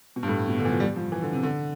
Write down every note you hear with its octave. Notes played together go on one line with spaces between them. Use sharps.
B2
G2
A2
B2
D3
E3
F3
G3
F3
E3
D3
C3
D3